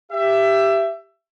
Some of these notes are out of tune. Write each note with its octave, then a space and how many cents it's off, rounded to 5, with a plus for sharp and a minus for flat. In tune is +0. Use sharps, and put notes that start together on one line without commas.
G4 +0 E5 +20